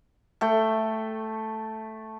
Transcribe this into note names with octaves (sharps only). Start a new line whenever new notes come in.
A3 G5